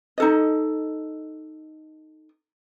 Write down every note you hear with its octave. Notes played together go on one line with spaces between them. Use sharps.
D#4 A4 D#5